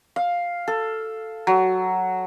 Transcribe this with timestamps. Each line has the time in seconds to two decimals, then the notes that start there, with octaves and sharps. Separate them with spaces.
0.16 F5
0.68 A4
1.47 F#3